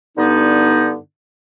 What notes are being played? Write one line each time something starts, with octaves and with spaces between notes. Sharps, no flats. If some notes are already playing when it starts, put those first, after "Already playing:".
G2 D3 B3 D#4